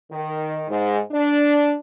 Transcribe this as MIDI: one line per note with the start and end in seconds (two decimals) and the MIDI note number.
0.11 0.62 51
0.69 0.98 44
1.12 1.75 62